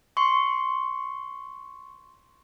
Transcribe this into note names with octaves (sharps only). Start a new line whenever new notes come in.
C6 C#6